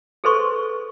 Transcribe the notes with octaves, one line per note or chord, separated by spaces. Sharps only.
G#4 A4 B4 C5 C6 C#6